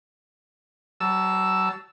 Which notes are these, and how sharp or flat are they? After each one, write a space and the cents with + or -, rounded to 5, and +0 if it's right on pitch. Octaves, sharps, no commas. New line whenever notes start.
F#3 +35 A5 +0 E6 +0